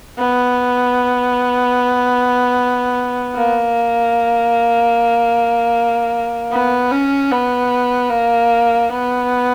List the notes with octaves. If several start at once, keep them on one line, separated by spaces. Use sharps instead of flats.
B3
A#3
B3
C#4
B3
A#3
B3